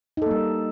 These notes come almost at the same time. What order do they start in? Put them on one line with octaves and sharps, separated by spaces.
D#4 A4 A#3 G3